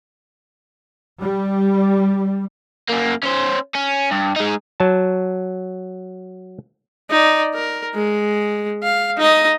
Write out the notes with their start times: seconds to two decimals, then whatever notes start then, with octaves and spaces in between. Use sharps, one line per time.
1.21 G3
2.89 F#2 A#3
3.23 C#4 C5
3.75 C#4
4.11 G2
4.36 G#3 D#4
4.80 F#3 A5
7.10 D#4 D5
7.55 A#4
7.94 G#3
8.83 F5
9.17 D#4 D#5